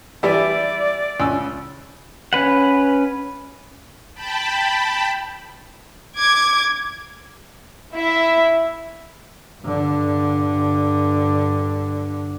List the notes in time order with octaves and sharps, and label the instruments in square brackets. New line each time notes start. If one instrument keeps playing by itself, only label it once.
[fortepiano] E3 G3 E4 [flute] D5
[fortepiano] C#2 E6
[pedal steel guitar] C#4 B4 F#5
[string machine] G5 A5 B5
[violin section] D6 G#6
[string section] E4 E5
[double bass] G2 D3